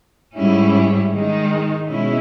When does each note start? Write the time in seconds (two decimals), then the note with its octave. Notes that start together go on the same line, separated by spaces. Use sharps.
0.37 G#2 G3 C#4 E4
1.13 D#3 G#3 D#4
1.88 B2 G#3 C#4 E4